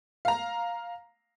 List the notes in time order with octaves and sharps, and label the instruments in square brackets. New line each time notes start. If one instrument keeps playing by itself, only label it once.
[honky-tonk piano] F5 A#5